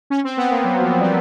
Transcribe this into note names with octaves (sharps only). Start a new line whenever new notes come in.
C#4
C4
B3
A#3
F#3
F3
G3